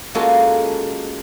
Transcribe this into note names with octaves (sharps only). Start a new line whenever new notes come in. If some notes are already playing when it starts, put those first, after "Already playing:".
G#3 A#3 C#4 F4 F#4 A4